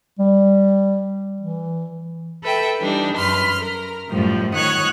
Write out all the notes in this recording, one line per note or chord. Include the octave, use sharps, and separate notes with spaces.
G3
E3
A4 B4 E5 G5
E3 G3 D4 D#4
F#2 B4 B5 C6 F6
A#4
F#2 A2 F3 G3
D#3 C#5 F#5 D#6 F#6 G#6